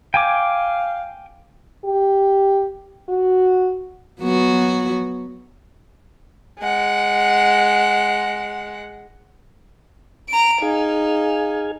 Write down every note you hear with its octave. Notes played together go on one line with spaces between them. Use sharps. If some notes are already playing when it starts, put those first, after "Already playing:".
F5 G5 G#5 D6
G4
F#4
F#3 B3 F#4
G#3 F#5
A#5 D7
D#4 G#4 F5 G#5